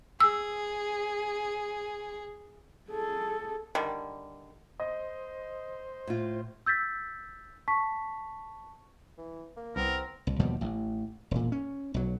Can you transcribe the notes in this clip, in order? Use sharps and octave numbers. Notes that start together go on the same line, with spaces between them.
G#4 E6
G#4 A4
D3 D#3 G3
C5 D#5
A2 F4
E6 G6 A6 B6
A5 C#6 B6
E3
A#3
C2 B3 C4 A#4
C2
D#2 B2 F3 G3
A1
E1 A#2
C#4
B1 F#3